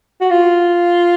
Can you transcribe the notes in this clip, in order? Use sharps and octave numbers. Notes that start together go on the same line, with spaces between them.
F#4
F4